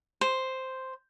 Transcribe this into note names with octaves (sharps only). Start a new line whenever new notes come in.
C5